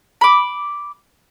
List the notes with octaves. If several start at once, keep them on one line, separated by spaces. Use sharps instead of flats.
B5 D6